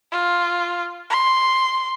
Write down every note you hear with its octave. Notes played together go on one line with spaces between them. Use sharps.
F4
C6